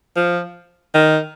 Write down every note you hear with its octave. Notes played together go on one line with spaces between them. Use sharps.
F3
D#3